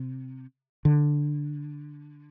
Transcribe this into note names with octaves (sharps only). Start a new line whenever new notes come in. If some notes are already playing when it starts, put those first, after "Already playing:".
Already playing: C3
D3